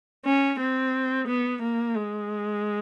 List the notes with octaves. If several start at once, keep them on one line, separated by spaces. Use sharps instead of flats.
C#4
C4
B3
A#3
G#3